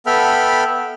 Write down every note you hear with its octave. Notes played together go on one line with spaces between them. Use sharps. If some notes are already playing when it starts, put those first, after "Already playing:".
B3 A4 E5 G5 B5 F6